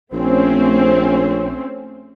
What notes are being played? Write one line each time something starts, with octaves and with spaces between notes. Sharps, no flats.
A#1 A3 C4 C#4